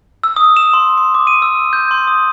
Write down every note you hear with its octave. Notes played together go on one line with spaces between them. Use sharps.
E6
D#6
E7
C6
C6
D6
D#7
E6
G6
C6
D#6